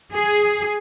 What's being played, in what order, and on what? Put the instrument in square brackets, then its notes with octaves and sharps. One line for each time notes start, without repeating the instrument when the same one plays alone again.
[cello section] G#4